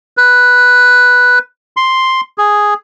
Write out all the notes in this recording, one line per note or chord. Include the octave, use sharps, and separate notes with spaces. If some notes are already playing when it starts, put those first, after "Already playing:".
B4
C6
G#4